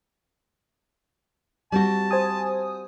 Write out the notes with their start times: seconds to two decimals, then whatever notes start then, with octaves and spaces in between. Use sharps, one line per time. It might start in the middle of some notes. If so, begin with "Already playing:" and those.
1.72 G3 C4 F#4 A5
2.11 C5 G#5 D#6